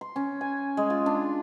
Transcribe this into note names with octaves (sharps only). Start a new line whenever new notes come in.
C6
C#4
G#5
G#3
F4
D4